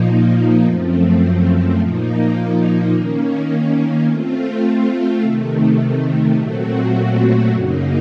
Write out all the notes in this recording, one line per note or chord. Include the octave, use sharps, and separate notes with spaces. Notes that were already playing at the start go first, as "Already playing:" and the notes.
Already playing: A#2 F3 A#3 D#4
F#2 F3 A3 C4
A#2 F3 A#3 D#4
D#3 A#3 C#4
A3 C4 F4
C3 D#3 A3
A#2 F#3 A3 C4 F#4
F#2 C#3 F#3 A#3 D#4